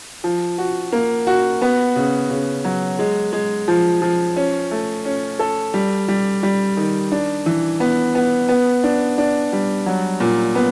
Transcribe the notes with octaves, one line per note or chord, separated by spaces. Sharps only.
F3
F#4
A#3
F#4
B3
C#3
C#3
F#3
G#3
G#3
F3
F3
C#4
A3
C#4
A4
G3
G3
G3
D#3
D4
E3
B3
B3
B3
D4
D4
G3
F#3
A#2
B3